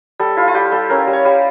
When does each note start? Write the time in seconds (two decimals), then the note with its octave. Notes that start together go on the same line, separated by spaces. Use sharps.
0.19 G3 A4
0.37 E4 F4
0.48 F4
0.55 G3 G4
0.72 G3 A4
0.90 C#4 A#4
1.07 G3
1.13 C#5
1.25 G3